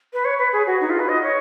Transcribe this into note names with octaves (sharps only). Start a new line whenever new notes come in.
B4
C#5
B4
G#4
F#4
D#4
F4
B4
D#5
C#5